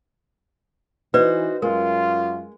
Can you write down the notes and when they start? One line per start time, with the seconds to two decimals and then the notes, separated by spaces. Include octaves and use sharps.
1.14 E3 D#4 F#4 B4 C5 D5
1.62 F#2 G#3 F4 A#4